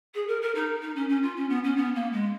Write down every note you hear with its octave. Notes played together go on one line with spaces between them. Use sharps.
G#4
A#4
A#4
D#4
D#4
C#4
C#4
F4
C#4
B3
C#4
B3
A#3
G#3